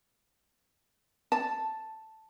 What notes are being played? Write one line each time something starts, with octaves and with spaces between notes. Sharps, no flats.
A5